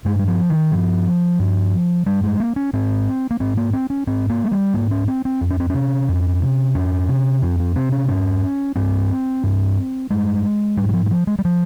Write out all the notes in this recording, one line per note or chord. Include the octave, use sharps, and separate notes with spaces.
G2 G#3
G3
F3
D#3
G2 F3
G2
G2 G3
G#3
A#3
C#4
G#2 C4
A#3
G#2 C4
A#3
C4
C#4
G#2 C4
A#3
G#3
G3
G#2 A#3
C#4
C4
C4
F2
C#4
C4
C3 C#4
F2
C3
F2 C#4
C3
F2 C4
C4
C3 C4
C#4
G2 C#4
G2 C4
G2
G2 G#3
G#2 G3
G3
F3
G3
F3
G#3
G3
F3